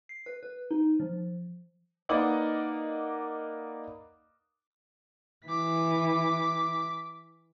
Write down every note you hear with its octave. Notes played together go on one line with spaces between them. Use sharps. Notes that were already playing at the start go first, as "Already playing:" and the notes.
C7
B4
B4
D#4
F3
A#3 D#4 B4 D5 D#5 F#5
E3 D6 B6